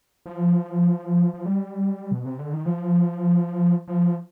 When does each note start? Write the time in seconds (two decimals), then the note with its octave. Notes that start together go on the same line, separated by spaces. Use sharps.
0.26 F3
1.34 F3
1.46 G3
2.11 B2
2.25 C3
2.39 D3
2.53 D#3
2.66 F3
3.88 F3